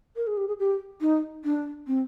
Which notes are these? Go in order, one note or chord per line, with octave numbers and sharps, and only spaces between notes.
A#4
G#4
G4
G#4
G4
D#4
D4
C4